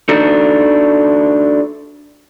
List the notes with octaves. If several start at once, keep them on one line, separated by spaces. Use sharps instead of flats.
D4 D#4 F#4 A4